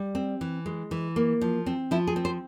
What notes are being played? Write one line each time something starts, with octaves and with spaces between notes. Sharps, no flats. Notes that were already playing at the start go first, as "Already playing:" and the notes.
Already playing: G3
C4
E3
G#3
E3
A#3
F3
C4
F3 E4
G#4
C4
C5